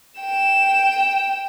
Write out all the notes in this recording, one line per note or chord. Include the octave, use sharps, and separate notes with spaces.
G5 E7